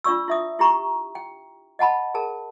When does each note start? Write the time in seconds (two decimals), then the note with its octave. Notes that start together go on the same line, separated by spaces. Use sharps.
0.04 D4 F4 D5 C#6 E6
0.28 E4 E5 D#6
0.59 E4 G4 A#5 C#6
1.15 G5
1.79 D#5 F#5 A5 B5
2.14 G#4 A#4 A5